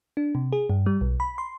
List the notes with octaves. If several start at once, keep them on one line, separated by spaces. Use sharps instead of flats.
D4
C3
G#4
G2
G3
B1
B5
C6